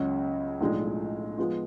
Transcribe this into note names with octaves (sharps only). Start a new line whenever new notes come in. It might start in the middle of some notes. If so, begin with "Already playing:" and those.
Already playing: C#2 C#3 F#3 C#4 F#4
B1 A2 F3 G#3 D4
F3 G#3 B3 F4